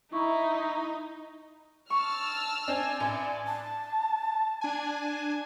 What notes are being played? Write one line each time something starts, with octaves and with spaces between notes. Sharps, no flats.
D#4 E4 A#5 C#6
A5 C#6 E6 F6
C4 D4 G#5
A1 D5 G#5
A5
D4 G#5